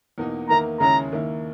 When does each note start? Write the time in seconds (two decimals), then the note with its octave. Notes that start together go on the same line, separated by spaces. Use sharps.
0.18 E2 B2 A#3 D#4
0.49 E2 D#3 A#3 E4 A#5
0.80 D#2 C#3 G#3 C#4 E4 A#5
1.12 D#2 D#3 A#3 E4